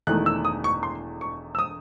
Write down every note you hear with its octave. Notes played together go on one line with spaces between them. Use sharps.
E1 E2 D#3 A3 D#4 F#6
E6
D#6
C#6
C6
C#6
E6
D#6